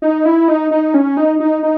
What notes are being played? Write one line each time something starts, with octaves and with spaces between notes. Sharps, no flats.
D#4
E4
D#4
D#4
C#4
D#4
D#4
D#4